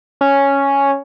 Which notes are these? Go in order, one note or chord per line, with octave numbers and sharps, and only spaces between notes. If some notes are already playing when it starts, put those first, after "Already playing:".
C#4